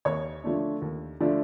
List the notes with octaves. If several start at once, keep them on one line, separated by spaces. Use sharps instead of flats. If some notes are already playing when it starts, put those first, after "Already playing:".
D#2 C#5 C#6
D3 F3 A3 D4
D#2
D3 F3 A3 D4